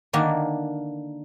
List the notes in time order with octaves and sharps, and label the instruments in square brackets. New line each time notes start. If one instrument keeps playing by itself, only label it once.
[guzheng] D3 D#3 A#3 D4